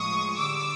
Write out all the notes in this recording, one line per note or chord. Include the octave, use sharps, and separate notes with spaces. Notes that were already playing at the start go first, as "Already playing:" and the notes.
Already playing: A2 F3 G#3 C#6 D#6
D3 G3 D6 E6